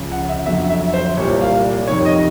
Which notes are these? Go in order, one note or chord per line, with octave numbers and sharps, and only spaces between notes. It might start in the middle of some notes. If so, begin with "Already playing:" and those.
Already playing: C#2 C#3 F3
F#5
E5
F2 D3 F#3 E5
E5
C5
C2 A#2 G3 C#5
F5
F2 C3 D#3 C#5
D#5